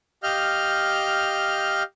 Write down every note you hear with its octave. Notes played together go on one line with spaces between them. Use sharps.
G4 D#5 F5 F6 G6